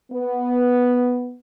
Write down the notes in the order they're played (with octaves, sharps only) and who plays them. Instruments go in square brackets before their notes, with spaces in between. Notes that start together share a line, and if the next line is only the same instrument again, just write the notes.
[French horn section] B3